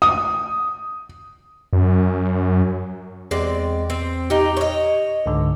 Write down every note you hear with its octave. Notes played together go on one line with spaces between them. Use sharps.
D#6
F#2
E2 G#3 C4 D5
C4
D#4 G4
C#5 D#5
C#2 G#2 D3